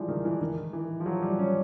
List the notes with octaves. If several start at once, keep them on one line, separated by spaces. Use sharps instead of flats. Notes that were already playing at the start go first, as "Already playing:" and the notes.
Already playing: E3 F3 G3 G#3
D#3
E3
D#3
E3
F3
F#3
G3
C#4